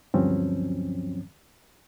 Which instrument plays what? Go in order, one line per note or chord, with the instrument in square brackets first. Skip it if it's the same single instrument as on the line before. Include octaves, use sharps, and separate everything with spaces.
[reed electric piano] D2 G2 F3 F#3 C4 C#4